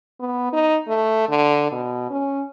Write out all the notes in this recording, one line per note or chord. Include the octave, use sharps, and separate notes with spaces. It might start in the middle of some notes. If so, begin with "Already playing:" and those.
B3
D#4
A3
D3
B2
C#4